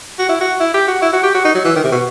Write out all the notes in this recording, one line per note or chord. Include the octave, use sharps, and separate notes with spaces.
F#4
E4
F#4
E4
G4
F#4
E4
F#4
G4
F#4
D#4
F#3
E3
D#3
C3
B2